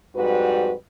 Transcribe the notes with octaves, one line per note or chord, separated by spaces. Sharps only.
F2 G#2 G3 F#4 B4